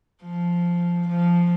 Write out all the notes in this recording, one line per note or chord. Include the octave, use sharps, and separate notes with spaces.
F3
F3